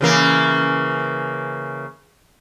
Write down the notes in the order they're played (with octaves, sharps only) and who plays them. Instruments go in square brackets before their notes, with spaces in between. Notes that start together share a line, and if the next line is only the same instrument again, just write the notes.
[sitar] C#3 E3 A#3